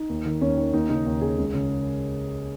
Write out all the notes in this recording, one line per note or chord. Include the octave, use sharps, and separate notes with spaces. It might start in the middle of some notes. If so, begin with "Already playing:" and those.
Already playing: D#4
D#2
D#3
D#2 C#4
D#3
D#2 D#4
C#3 D#4
D#2
C#3 G#4
C#2
C#3